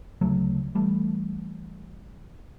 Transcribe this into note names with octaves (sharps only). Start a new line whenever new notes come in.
D2 C#3 F#3 A3
E3 G3 A3